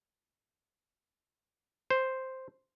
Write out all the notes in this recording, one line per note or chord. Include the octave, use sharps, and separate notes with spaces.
C5